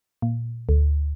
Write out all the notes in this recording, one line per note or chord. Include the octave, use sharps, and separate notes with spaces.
A#2
D2